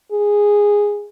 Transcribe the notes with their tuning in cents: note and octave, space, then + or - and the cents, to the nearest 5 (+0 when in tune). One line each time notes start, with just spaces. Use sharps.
G#4 -10